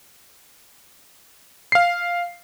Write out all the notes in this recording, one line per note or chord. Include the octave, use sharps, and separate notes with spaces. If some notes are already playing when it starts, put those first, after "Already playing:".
F5 C7